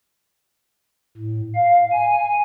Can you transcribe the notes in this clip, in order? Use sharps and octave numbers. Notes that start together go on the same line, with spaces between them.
A2
F5
G#5